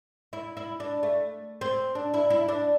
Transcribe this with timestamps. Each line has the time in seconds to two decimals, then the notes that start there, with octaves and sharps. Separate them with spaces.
0.33 E4
0.57 E4
0.80 D4
1.03 A3
1.61 C4
1.95 D4
2.14 E4
2.30 E4
2.48 D4